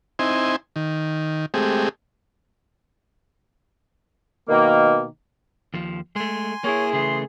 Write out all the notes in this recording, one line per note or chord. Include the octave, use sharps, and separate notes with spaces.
C4 D#4 E4 G#5 C6
D#3
G#3 A3 C4 G4 G#4
B2 D#3 A#3
D#2 F3
G#3 A3 G#5 C6
A#3 E4 G#4 C#5
C#3 E3 A3 C6